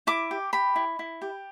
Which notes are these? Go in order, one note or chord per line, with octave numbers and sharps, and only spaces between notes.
E4 D6
G4
G4 B5
E4
E4
G4